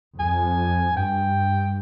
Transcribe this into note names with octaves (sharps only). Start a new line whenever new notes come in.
F2 G#5
G2 G5